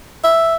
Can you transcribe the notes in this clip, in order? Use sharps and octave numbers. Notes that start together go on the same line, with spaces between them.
E5